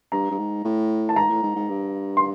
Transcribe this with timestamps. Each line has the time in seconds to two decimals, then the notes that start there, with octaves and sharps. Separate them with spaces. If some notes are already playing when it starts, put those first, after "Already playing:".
0.12 G2 A#5
0.31 G2
0.38 G#2
0.64 A2
1.09 A5
1.16 G#2 A#5
1.30 A2
1.43 G#2
1.55 G#2
1.69 G2
2.17 C6